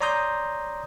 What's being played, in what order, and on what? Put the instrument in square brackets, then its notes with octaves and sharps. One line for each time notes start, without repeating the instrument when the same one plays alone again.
[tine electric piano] C#5 D5 A#5 C6 D#6 G6